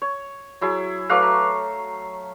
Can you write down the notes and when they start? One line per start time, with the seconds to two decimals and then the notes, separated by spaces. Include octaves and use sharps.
0.02 C#5
0.61 F#3 E4 G#4
1.10 F#3 A3 B4 F5 D6 F#6
1.22 A#5